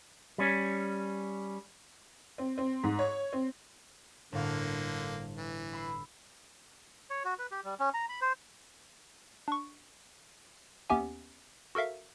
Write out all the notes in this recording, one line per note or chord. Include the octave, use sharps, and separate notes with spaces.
G3 C#4
C4
C4
G#2
C#5
C4
G1 A2 D3 A#3 F5
E3
B5 E6 C7
C#5
F#4
B4
G4
G3
C#4
A#5
B5
C5
D4 C#6
D#2 B3 C#4 G4 E5 G#5
F#4 A4 A#4 E5 F5